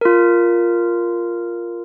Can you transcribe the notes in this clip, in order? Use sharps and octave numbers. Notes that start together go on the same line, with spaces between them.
F4 A#4